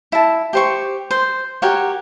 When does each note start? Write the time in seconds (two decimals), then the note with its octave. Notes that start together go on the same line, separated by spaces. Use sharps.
0.12 E4 A5
0.53 G4 C5 C#6
1.11 C5
1.62 F#4 G4 A#4 C#5